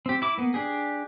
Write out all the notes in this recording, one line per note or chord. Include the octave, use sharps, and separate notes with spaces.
C4 G4
E4 D6
A#3 B3
D4 G4 G#4